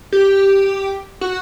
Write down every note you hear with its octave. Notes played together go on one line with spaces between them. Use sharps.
G4
F#4